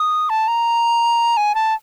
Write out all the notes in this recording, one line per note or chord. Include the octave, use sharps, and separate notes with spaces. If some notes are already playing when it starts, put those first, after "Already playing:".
Already playing: D#6
A5
A#5
G#5
A5